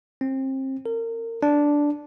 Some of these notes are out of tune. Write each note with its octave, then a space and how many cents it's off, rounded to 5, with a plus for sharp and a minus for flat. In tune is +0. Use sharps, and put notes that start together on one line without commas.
C4 +30
A#4 -30
D4 -5